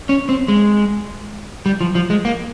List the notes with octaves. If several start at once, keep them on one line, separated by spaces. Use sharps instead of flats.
C#4
C4
G#3
G3
F3
F3
G#3
A#3